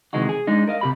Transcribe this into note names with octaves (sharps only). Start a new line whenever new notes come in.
C3 D#3 E3 G#3 D#4 F#4
G#4
G#3 D4 D#4
A#4 D#5 F5
C3 G4 B5